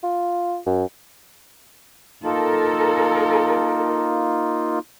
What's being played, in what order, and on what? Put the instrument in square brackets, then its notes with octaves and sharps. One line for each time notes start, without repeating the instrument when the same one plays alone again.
[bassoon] F4
F#2
[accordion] A#3 D#4 F4 [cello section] A4 A#4